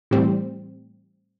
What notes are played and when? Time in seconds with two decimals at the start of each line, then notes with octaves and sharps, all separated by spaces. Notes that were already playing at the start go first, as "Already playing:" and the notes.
0.11 A2 E3 G3 C4